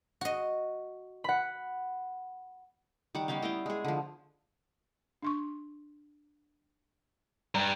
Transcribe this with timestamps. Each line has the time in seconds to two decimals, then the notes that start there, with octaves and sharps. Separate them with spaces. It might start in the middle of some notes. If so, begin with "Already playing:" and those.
0.21 F#4 D#5
1.24 F#5 B5
3.15 D#3 G3 F#5 D6
3.28 G3 B3 C#4 F5
3.42 E4 D#5 F5 G5
3.66 G#3 G#4
3.85 D3 F3
5.22 D4 C6 C#6
7.55 G2 A#5